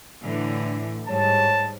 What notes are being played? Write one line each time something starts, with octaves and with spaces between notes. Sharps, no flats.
A2 D3 E3
G#2 G3 C#5 A5